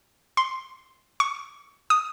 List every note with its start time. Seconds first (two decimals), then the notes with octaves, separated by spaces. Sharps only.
0.37 C6
1.20 C#6
1.90 D#6